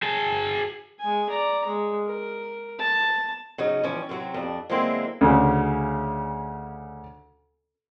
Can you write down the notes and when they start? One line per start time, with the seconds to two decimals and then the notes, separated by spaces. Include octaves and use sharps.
0.03 G#4 A5
1.00 G#3 G#5
1.29 D5 A#5
1.66 G#3
2.06 A#4
2.79 A5
3.58 C#3 F#3 C#4 D#4
3.83 E3 F3 G3 C#4
4.09 F#2 C3 F#3 C4
4.34 F2 D4
4.69 D3 F#3 G#3 A#3 C4 E4
5.21 D2 C#3